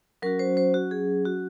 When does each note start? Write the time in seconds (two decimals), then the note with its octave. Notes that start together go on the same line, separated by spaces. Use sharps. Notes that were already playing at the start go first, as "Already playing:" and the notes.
0.22 F#3 C#4 F#4 A#4
0.39 C5
0.57 C5
0.74 F#4
0.91 G#4
1.25 F#4